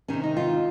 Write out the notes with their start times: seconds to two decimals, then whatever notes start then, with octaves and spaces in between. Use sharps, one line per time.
0.08 C3 D#3 C#4
0.23 D#4
0.37 F4